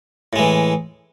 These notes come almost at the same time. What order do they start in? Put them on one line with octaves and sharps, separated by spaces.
A2 G#3 E3